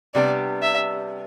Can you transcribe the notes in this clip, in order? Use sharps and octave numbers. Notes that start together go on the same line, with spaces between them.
C3 G3 B3 D4 D5
E5